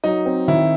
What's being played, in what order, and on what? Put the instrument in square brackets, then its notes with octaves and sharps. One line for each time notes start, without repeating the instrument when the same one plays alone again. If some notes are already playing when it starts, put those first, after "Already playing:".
[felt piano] F#3 [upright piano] D#4
[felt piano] C4
[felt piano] D#3 [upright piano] E4